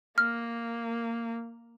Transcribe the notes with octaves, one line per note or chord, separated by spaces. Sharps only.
A#3 F6